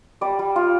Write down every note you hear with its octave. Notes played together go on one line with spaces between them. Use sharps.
G3 D5
G3
F4